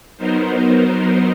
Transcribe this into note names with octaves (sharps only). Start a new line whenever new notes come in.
F#3 B3 D#4 A#4 C5